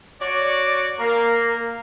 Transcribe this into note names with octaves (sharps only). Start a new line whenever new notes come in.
F#4 C#5 D5
A#3